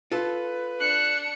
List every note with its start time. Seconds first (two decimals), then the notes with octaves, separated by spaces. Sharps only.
0.12 F4 A4 B4
0.80 D4 F#6 C#7